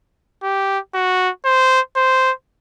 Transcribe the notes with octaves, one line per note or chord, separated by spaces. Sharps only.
G4
F#4
C5
C5